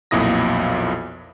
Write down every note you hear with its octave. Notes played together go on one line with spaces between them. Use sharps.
B1 F2 A#2 E4 D#6 A#6